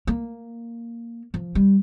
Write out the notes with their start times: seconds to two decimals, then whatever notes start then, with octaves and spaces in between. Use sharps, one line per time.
0.07 A#3
1.34 F3
1.55 G3